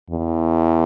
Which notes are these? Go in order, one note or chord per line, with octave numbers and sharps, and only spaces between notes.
E2